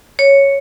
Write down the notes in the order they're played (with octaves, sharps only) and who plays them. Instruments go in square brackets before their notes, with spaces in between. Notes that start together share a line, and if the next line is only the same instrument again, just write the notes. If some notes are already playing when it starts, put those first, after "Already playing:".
[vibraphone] C#5